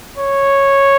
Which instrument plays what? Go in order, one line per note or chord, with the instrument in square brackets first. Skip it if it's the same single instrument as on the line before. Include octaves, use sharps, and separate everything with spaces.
[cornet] C#5